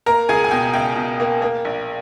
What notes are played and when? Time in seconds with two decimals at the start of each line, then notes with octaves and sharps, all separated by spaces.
0.06 A#3 A#4 A#5
0.29 C#2 G#4 G#5
0.44 G#5
0.51 B2 G5
0.73 C#2 G5
0.96 B2
1.20 A#3
1.42 A#3
1.65 A#1